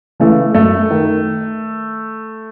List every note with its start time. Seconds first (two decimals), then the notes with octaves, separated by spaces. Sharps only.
0.20 C#3 E3 A3
0.54 F#2 A3
0.90 D#3